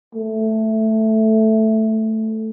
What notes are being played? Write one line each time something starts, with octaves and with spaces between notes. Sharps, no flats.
A3